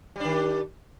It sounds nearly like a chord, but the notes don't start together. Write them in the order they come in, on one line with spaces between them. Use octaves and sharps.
G3 D4 D#3